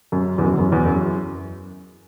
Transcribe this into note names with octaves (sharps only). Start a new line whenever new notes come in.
F#2
E2
F#2
E2
F#2
E2
F#2